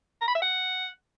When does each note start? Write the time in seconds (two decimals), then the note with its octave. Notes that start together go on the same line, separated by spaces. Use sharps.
0.21 A#5
0.28 B5
0.35 E5
0.42 F#5